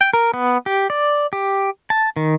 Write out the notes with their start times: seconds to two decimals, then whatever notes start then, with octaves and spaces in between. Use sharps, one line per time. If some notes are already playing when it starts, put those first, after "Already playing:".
0.01 G5
0.14 A#4
0.34 B3
0.66 G4
0.90 D5
1.33 G4
1.90 A5
2.16 D#3